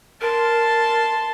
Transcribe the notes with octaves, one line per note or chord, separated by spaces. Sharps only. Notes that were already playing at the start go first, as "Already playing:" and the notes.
A#4 A5 C6